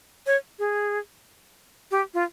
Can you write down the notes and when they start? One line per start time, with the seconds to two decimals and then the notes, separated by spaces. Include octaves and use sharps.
0.26 C#5
0.59 G#4
1.91 G4
2.14 F4